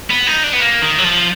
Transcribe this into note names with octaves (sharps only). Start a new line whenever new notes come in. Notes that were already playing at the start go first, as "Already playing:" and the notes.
B3
D#4
D4
B3
A#3
D#3
F#3
F3